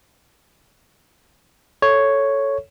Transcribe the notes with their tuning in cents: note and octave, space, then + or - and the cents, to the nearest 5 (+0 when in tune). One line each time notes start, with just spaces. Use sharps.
A4 +0 C#5 +0